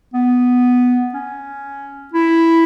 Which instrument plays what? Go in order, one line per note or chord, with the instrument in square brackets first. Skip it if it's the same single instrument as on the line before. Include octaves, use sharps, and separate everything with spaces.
[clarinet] B3
C#4
E4